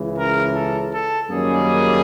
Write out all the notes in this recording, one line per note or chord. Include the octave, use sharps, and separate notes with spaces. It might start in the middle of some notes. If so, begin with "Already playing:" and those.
Already playing: C#2 C#3 E3
A#4
A4
A4
F#2 D#3 G3 A#3 C#4 G#4